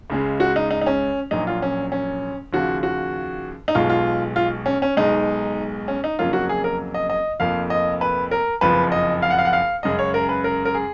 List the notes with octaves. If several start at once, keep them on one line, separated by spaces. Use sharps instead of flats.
C#2 C#3 G#3
F#4
D#4
D#4
D#4
C#4
A#1 A#2 F#3 D#4
F4
C#4
C#4
D#2 C#3 F3 F#4
F#4
D#4
B1 B2 G#3 F4
F4
F4
C#4
C#4
B1 B2 G#3 D#4
C#4
D#4
F2 C#3 F#3 A#3 F4
F#4
G#4
A#4
D#5
D#5
F1 F2 F3 A#3 F5
D#5
B4
A#4
F#1 F2 F3 B4
D#5
F5
F#5
F5
F#5
F5
F#2 C#3 G#3 D#5
C#5
A#4
B4
A#4
A#4
G#4